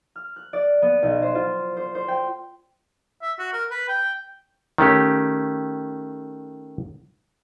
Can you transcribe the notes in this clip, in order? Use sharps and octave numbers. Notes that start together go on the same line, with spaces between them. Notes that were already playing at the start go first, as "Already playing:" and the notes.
F6
F#6
D5
B3
B1
C5
F4
C5
C5
G5
E5
F#4
A#4
B4
G5
D#3 A3 C#4 G4